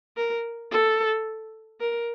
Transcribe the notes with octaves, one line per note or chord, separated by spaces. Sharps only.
A#4
A4
A#4